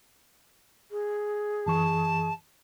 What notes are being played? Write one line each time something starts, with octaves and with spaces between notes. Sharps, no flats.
G#4
F#2 E3 A5 C#6